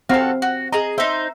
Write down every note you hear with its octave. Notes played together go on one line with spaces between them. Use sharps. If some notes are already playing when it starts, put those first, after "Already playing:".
C4 F#4 A4 F5
F#4
G#4 D#5 A#5
D#4 C5 E5